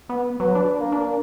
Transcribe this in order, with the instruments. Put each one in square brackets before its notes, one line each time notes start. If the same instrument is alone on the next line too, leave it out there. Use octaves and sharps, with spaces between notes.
[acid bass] B3
[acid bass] F#3 [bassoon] B4
[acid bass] D4
[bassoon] A#3
[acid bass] D4